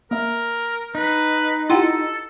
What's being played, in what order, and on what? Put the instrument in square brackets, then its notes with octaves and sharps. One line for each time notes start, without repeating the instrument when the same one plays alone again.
[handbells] A#3 E5 [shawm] A#4
[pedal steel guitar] D#4 [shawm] B4
[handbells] E4 F4 G4 [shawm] A4 [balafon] F#5 G5 C6